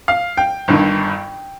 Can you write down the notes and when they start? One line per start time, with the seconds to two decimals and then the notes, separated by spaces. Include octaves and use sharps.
0.08 F5
0.37 G5
0.68 G1 G2 D#3